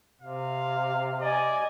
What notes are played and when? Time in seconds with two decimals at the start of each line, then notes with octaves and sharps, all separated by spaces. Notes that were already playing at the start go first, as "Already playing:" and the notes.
0.22 C3 F5
1.21 D5 D#5 G#5